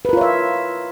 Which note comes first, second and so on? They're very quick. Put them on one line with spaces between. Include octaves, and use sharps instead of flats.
B4 A#4 F4 C#5 E5